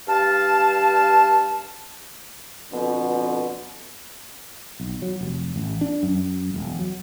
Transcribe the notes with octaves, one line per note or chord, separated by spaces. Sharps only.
G2 F5 A5
F2 B2 D3 B3
B1
F#3
F1
A1
D4
F#2
E1
F#3